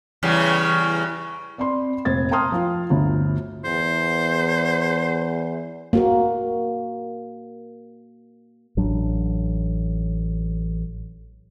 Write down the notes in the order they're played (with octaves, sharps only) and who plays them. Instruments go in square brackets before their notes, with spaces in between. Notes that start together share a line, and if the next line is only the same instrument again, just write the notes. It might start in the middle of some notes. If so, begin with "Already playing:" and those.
[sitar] E2 C#3 G3
[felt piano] C4 D5 B5 C6
F1 A#2 C5 G#6 A6
G5 A5 A#5 C6 D#6 F6
F3 F4
G1 D2
[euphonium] E2 [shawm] C5
[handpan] A#3 F#4 A#4
[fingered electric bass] A1 F#3 D4